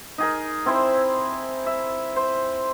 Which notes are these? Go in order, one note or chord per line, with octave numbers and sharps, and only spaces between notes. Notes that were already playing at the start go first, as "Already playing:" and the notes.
D#4 G#4 A#4
C4 E4 C5
E5
C5